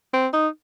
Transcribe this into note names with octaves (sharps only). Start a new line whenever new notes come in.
C4
D#4